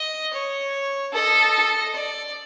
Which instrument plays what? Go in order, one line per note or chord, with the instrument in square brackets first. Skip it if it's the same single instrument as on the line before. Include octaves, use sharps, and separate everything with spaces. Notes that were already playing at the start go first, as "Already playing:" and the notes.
Already playing: [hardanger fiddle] D#5
C#5
[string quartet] A4 [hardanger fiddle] D#5
[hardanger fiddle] D5